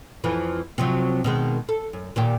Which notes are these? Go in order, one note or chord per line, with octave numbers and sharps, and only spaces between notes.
F2 E3 F3
C3 F3 F#3
B2 D#3 G#3
A4
F#2
A#2 D#3 G4